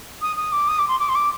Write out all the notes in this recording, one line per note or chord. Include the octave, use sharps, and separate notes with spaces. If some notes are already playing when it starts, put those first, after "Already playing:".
D#6
D#6
D6
D#6
D6
C6
D6
C6
D6